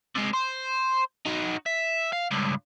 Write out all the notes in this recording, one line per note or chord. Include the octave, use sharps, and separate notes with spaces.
C3 G#3
C5
D#4 F#4
E5
F5
C#2 G2